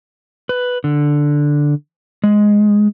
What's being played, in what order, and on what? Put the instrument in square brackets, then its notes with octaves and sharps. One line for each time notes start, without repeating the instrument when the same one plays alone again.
[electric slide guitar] B4
D3
G#3